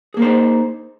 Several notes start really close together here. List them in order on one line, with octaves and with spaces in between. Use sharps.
G#4 A#3 A#4 C5 D#4